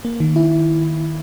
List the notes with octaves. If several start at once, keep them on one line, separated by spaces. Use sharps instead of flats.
A#3
D#3
E4